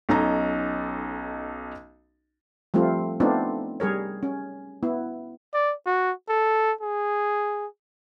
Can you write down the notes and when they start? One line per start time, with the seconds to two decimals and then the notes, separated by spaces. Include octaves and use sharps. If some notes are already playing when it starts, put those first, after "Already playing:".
0.09 B1 C#4 D#4 A4 D#5 A#5
2.74 F3 G3 A3 C4 F4
3.20 A3 B3 C4 D4 D#4 F4
3.80 G3 G#4 A#4 C#5
4.23 C#4
4.83 B3 E4
5.54 D5
5.86 F#4
6.29 A4
6.81 G#4